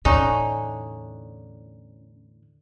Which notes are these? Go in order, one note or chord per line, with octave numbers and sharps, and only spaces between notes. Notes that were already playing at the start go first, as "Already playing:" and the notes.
E2 A2 D3 C#4 D#4